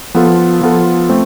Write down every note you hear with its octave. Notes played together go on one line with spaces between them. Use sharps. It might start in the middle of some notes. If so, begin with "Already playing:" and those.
F3 B3 F4 A4
F3 B3 F4 A4
A3 C4